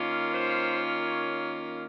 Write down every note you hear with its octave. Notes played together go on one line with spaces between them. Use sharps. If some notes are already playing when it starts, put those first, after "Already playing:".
Already playing: D#3 A#3 C#4 F4
C5
C#5